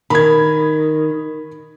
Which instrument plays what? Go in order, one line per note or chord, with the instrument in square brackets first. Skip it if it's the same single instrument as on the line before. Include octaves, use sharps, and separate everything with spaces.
[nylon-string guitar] D#3 [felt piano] B5 G#6